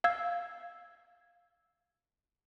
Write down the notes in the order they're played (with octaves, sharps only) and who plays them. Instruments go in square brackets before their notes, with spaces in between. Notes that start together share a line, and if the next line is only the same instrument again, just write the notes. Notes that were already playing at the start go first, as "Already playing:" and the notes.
[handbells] F5 E6 G#6